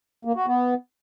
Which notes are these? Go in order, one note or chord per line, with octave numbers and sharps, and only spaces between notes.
A#3
F#4
B3